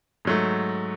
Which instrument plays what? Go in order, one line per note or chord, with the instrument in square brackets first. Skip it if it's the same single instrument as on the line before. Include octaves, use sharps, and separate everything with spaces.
[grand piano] G#2 F#3 A3